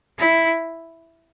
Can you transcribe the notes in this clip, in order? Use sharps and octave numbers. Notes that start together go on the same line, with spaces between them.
E4